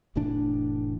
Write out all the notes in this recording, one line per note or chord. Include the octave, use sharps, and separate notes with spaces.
F1 A2 E3 D4